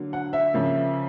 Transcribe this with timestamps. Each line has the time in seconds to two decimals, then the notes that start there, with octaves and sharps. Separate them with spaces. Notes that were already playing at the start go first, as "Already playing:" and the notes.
Already playing: D3 F#3 A#3
0.13 F#5
0.33 E5
0.54 C#3 F3 A#3